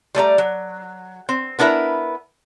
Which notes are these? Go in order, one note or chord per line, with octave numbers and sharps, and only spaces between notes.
G3 A3 D5 A#5
F#3
C4
B3 D4 E4 A#4 E5